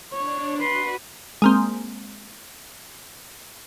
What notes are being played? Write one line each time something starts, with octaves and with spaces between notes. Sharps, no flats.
D4 C#5
F#4 B4 C6
G#3 A#3 C4